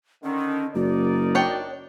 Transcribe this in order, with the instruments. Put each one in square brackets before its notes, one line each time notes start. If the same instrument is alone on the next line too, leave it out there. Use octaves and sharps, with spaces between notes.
[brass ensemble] D3 D#3 [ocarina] C#4
[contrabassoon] F#1 [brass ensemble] D#4 A#4 D5 [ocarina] F#4
[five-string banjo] D4 C#5 G5